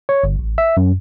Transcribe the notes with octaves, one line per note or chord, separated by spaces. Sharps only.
C#5
G1
A1
E5
F#2